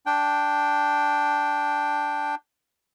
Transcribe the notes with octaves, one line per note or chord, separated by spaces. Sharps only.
D4 G5